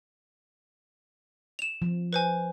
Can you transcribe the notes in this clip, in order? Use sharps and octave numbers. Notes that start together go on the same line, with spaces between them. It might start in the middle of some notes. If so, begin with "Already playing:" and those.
E7 F7
F3
B4 C5 G#5